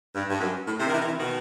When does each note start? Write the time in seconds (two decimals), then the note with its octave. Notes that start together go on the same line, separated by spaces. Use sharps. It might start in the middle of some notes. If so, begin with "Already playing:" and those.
0.14 G2
0.29 G2
0.40 F#2
0.66 A2
0.78 C3
0.87 D#3
0.92 C3 E3
1.00 D#3
1.05 C3 E3
1.18 B2 D#3